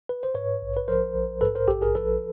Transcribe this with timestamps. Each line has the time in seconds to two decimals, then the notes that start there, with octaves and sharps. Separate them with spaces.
0.09 B4
0.23 C5
0.34 G#2 B4 C#5
0.62 A#1
0.77 B4
0.88 F3 A#4 C5
1.15 A#1
1.41 G#2 A4 B4
1.55 A#4 C5
1.68 A#1 G4 A4
1.82 G#4 A#4
1.95 F3 A4 B4